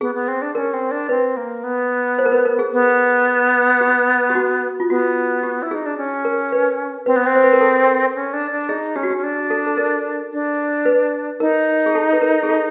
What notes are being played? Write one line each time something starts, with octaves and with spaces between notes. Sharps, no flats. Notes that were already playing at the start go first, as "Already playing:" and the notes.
B3 G#4
B3
C4
D4
C#4 A#4
C4
D4
C4 B4
A#3
B3
C5
A#4
B4
A#4
G#4
B3
G4
G4
F#4
F4
B3 F#4
G4
E4
D#4 G#4
D4
C#4
A#4
B4
C4 B4
B3
C4
C5
B4
A#4
A4
C#4
D4
D4
D#4 G#4
C#4 G4
F#4
G4
C#4
D4
A4
A4
A#4
D4
B4
D#4 A#4
G#4
A4
B4
A#4
G#4
A4